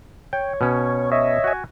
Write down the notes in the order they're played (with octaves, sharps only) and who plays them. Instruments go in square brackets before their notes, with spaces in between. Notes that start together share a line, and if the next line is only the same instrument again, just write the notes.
[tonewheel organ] C#5 [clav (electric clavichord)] G5
[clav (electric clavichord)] B2 C#4
[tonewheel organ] C#5 D#5 E5
[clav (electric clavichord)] F#4 G#5